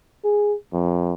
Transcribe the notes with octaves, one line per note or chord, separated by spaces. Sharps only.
G#4
F2